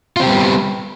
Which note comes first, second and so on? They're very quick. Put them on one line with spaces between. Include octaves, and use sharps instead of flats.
F4 C4 G4 G3 B3